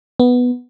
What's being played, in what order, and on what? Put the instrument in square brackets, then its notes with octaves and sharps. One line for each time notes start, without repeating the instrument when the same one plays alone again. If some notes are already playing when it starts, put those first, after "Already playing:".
[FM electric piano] B3